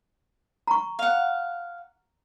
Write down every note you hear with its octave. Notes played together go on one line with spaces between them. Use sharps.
A#5 C#6
F5 F#5